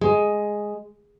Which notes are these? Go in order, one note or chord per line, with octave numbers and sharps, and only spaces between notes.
G#3